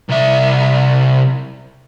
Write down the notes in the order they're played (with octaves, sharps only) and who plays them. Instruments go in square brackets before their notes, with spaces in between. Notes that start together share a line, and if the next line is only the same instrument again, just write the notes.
[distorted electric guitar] C2 E5